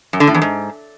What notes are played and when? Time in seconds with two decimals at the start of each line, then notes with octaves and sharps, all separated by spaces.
0.13 F#2
0.20 D3
0.27 A2
0.34 E2
0.42 G#2